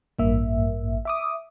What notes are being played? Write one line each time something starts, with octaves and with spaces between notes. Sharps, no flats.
A1 G2 A#3 E5
E5 D6 D#6